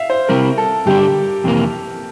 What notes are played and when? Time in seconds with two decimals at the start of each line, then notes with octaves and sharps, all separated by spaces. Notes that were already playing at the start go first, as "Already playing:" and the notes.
Already playing: E5 F5
0.10 C5
0.28 C3 G3 C4 E4 A#4
0.58 A4
0.86 G2 D3 G3 D4 G4
1.44 F2 C3 E3 A#3